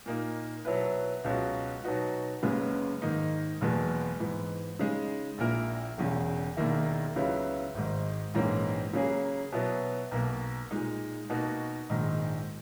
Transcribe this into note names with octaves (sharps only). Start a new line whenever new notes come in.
A#2 A#3 D#4
B2 F#3 B3 E4 B4
C#2 B2 F#3 C#4 F#4
B2 F#3 B3 D#4 F#4
F#1 F#2 C#3 G#3 B3
G#2 D#3 A#3 D#4
F#1 E2 B2 G#3 B3
G#2 E3 B3
C#3 G#3 D#4
A#1 A#2 A#3 E4 A#4
E1 E2 C#3
E1 D#2 D#3 A#3 E4
C#2 C#3 F#3 B3 E4
G#1 G#2 D#3
A#1 G#2 E3 A#3 C#4
C#3 F#3 A#3 C#4 G#4
B2 F#3 B3 E4
B1 B2 A#3
A#2 G#3 D#4
B2 A#3 D#4 F#4
A#1 G#2 D#3